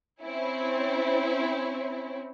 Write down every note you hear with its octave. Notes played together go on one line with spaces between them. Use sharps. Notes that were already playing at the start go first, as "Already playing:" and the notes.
C4 C#4 E4